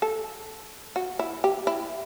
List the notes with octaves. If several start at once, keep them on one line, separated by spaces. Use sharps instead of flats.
A4
F#4
E4
G4
E4